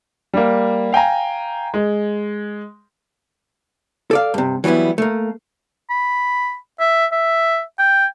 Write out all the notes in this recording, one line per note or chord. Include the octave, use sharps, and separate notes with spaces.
G3 A#3
F5 G5 G#5 A#5
G#3
A4 D5 F5
G2 C3
E3 F#3 G3 B3 E4
A3 A#3
B5
E5
E5
G5